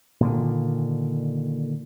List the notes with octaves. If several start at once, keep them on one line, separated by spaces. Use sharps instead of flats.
A#2 D3 D#3